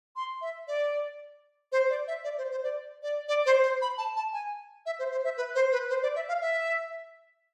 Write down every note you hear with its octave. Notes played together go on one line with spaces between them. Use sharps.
C6
E5
D5
C5
D5
E5
D5
C5
C5
D5
D5
D5
C5
C5
B5
A5
A5
G#5
E5
C5
C5
E5
B4
C5
B4
C5
D5
E5
F5
E5